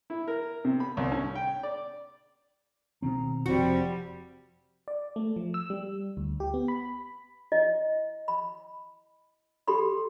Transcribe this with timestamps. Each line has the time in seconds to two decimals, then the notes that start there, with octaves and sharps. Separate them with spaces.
0.10 E4
0.28 A#4
0.65 C3
0.80 B5
0.97 C2
1.12 C#4
1.35 G5
1.63 D5
3.02 B2 D#3 C4 A#5
3.46 F1 F3 G3 C4 F#4
4.88 D5
5.16 A3
5.36 F3
5.54 E6
5.70 G3
6.17 D2
6.40 G4
6.54 B3
6.68 B5
7.52 E4 D#5
8.28 B5
9.68 G4 A4 B5 C6